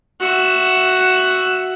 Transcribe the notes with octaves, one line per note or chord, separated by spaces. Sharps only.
F#4 E5